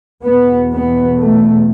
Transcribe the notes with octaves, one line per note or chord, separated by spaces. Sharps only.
E2 B2 B3
B3
A3